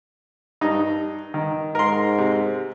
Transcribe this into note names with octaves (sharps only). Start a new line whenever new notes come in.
G2 D#4
D#3
G#2 A#4 C6
C3